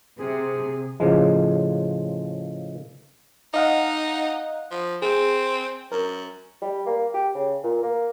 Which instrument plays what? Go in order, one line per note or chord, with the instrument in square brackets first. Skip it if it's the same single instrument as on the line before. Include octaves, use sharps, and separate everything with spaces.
[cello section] C3 [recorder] G#4
[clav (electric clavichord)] A2 C#3 F3 G#3
[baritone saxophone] D#4 [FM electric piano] D#5 F5 F#5
[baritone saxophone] F3
[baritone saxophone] C4 [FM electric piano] G#4
[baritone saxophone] F#2 [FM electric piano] A#4
[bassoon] G3
A#3
G4
C#3
A#2
A#3